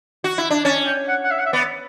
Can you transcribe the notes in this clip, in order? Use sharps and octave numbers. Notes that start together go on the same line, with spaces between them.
F#4
E4
D4
C#4 A5
G5
F#5
F#5
E5
F#5
E5
B3 D5